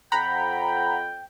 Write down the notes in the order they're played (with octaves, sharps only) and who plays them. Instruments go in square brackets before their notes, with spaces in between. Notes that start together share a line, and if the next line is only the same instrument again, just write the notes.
[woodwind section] F2 G5 [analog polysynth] F#5 A#5 B5